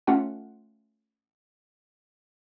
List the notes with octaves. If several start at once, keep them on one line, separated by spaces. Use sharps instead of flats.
A3 C#4 F4 F#5